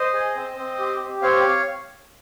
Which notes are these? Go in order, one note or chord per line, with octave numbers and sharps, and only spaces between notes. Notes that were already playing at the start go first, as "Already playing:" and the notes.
Already playing: C5 D#5
G#4
C4
C4
G4
G4
C4 C#5 F5